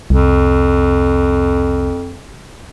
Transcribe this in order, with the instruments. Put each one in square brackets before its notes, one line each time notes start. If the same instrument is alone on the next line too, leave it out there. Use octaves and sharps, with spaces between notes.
[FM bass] C2 [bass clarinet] F2